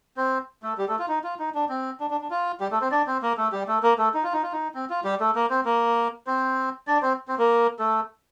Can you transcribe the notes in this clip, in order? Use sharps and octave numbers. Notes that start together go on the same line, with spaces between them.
C4 C5
A3 A4
G3 G4
A3 A4
F4
D#4
F4
D#4
D4
C4
D4
D4
D4
F4
G3 G4
A3 A4
C4 C5
D4 D5
C4 C5
A#3 A#4
A3 A4
G3 G4
A3 A4
A#3 A#4
A3 A4
D#4
F4
D#4
F4
D#4
C4
F4
G3 G4
A3 A4
A#3 A#4
C4 C5
A#3 A#4
C4 C5
D4 D5
C4 C5
C4 C5
A#3 A#4
A3 A4